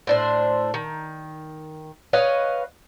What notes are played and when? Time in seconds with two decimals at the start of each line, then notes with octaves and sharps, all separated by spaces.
0.07 A2 D4 C5
0.74 D#3
2.13 B4 C#5 D#5 F5